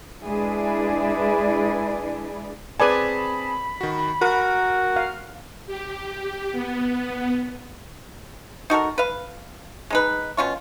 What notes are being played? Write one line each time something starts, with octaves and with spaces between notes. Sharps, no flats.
G#3 D4 E4 G#4 B4 D5
C4 G#4 B4 D5 G#5 A5 B5
D#3 F#4
F#4 A#4
F5
G4
B3
D#4 F#4 A4 A#4
B4 F5
G#3 D#4 B4
B2 C#4 F4 C#6